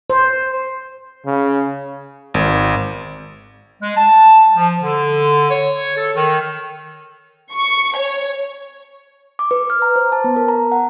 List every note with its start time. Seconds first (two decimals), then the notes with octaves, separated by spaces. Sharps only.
0.10 C5
1.26 C#3
2.34 G#1
3.82 G#3
3.97 A5
4.56 F3
4.81 D3
5.50 C#5
5.97 A4
6.15 D#3
7.53 C#6
7.97 C#5
9.39 D6
9.51 B4
9.70 F6
9.82 A#5
9.96 C5
10.12 A5
10.24 B3
10.36 A#4
10.48 A#5
10.72 F#5